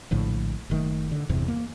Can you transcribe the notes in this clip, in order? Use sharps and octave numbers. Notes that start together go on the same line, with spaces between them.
A#1 A2 D3 F3
F#1 D#3 A3
D3
F#1 E2 G2 C3
A#3